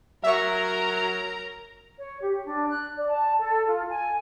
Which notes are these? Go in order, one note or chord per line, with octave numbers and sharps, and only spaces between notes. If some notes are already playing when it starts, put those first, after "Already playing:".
F#3 A#4 E5 A#5 C#6
C#5
G4
D4
F#6
D5
A5
A4
F4
G#5